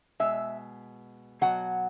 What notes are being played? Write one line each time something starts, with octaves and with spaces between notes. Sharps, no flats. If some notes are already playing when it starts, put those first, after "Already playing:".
B2 G#3 E5
B2 F#3 F#5